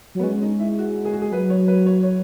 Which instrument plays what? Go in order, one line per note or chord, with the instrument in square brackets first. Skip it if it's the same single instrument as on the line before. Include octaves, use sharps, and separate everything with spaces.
[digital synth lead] F#3
[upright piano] B3
[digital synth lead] G#3 [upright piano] C#4
[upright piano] D#4
E4
F#4
G#4
F#4
G#4
[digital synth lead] F#3 [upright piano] B4
[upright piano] C#5
B4
C#5
C#5